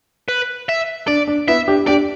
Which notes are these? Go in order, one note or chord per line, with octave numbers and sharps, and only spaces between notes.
B4
E5
D4 D5
D4
B3 E4 E5
D4 G4
D4 G4 D5